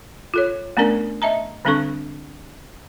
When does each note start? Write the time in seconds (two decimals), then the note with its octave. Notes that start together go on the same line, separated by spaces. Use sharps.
0.34 F4 A4 C#5
0.77 A3 B3 C#4 D4 A#4 D5
1.22 D#5 E5 A5 A#5
1.65 D3 G3 C4 D4 A4 C#6